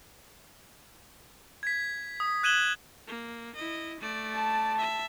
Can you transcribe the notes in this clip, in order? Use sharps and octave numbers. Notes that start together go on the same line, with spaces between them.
G#6 B6
D#6
F#6 G#6 D#7 E7 F#7 G7
A#3
E4 D#5
A3 D5
A5
E5